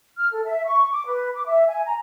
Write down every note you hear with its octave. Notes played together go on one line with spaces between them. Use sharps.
F6
A4
E5
C#6
D6
B4
D6
E5
G#5
A#5